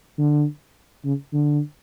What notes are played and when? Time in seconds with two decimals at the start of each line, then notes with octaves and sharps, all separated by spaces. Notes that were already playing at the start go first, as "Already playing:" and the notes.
0.18 D3
1.05 C#3
1.34 D3